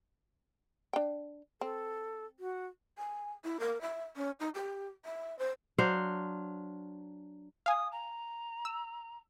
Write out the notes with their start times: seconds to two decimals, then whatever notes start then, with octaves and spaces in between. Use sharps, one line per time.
0.93 D4 G5
1.61 C4 A4
2.40 F#4
2.98 G#5
3.44 E4
3.60 A#4
3.81 E5
4.16 C#4
4.40 D#4
4.55 G4
5.05 E5
5.39 C5
5.78 F#3 D4 C5 F5
7.66 F5 G#5 D#6
7.91 A#5
8.65 E6